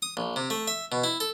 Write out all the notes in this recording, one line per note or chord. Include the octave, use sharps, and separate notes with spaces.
D#6
A#1
C3
A3
E5
B2
E4
A4